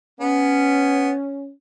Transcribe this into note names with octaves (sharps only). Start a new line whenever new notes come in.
B3 C#4